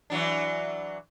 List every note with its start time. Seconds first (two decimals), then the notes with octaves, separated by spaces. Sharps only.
0.10 E3 F#3 D4